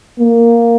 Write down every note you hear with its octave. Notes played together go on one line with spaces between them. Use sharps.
A#3